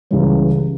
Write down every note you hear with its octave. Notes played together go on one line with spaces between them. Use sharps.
C#2 C#3 E3 G3 C#4